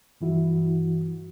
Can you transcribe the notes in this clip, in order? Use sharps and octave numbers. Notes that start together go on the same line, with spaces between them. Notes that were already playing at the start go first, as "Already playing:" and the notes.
G2 E3 E4 F#4